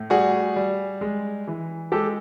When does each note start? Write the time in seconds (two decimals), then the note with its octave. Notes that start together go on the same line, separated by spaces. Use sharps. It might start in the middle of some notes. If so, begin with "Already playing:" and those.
Already playing: A2
0.10 G3 F#4 G#4
0.56 G3
1.01 G#3
1.47 E3
1.92 G#3 G4 A4